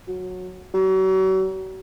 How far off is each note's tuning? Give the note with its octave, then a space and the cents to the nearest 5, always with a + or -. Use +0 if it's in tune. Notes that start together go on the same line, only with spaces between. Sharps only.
F#3 -15
F#3 +40